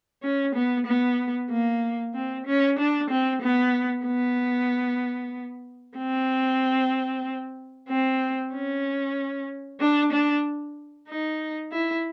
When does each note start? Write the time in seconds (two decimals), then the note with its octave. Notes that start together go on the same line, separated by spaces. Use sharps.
0.23 C#4
0.55 B3
0.86 B3
1.50 A#3
2.14 C4
2.46 C#4
2.78 D4
3.10 C4
3.42 B3
4.06 B3
5.97 C4
7.89 C4
8.53 C#4
9.81 D4
10.12 D4
11.08 D#4
11.72 E4